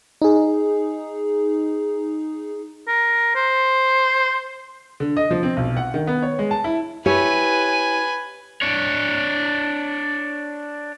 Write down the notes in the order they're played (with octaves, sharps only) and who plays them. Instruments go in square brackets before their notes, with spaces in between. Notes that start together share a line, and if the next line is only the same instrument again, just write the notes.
[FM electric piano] D#4 G#4
[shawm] A#4
C5
[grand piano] D3
D#5
F3
C4
B1
F#5
D#3
B3
C#5
G#3
A5
E4
[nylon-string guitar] E4 G4 C#5 [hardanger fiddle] B4 G#5
[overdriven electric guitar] D4 C#5